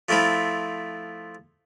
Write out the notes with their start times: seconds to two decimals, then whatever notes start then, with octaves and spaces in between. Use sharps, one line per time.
0.09 F3 A3 C4 E4 F4